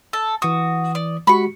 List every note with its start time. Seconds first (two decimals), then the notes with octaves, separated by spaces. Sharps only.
0.13 A4
0.42 E3 F#4 D#6
0.95 D5
1.27 G#3 F#4 G4 B5 C#6